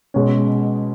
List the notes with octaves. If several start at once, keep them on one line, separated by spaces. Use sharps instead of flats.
B2 G#3 C#4